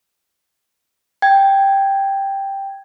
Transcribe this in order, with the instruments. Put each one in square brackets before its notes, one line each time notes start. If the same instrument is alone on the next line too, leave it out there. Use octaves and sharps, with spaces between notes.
[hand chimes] G5 G#6